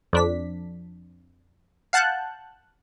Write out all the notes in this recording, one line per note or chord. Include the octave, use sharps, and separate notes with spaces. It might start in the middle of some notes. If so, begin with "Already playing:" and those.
F2 D4 B6
F5 F#5 A5 F#6 G6